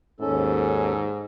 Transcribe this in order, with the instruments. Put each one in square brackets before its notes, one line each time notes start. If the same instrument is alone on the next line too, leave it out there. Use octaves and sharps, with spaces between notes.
[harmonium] D#2 C#4 A4 [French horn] G#2